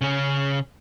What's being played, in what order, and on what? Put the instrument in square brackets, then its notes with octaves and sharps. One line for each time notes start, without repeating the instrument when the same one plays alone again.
[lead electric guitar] C#3 C#4